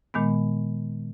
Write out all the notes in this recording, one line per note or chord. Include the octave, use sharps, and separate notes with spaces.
A#2 D#3 G#3 B3